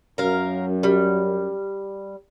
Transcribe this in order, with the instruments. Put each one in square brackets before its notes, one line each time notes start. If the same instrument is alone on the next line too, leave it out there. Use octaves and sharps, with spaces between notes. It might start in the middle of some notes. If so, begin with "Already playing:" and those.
[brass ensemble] F#2 [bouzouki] A#4 F5
[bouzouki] G3